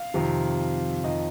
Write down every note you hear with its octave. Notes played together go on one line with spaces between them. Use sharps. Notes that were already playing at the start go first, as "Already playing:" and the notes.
Already playing: F5
F2 C3 D#3
F2 D#3 D#5